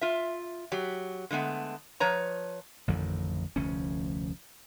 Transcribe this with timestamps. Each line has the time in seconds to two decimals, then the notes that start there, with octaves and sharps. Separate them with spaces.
0.01 F4 E5
0.72 F#3 G4
1.31 D3 G#3 A3 B3
2.00 F3 B4 C#5 A#5
2.88 A1 F2 D3 D#3
3.56 F1 D2 F3 C#4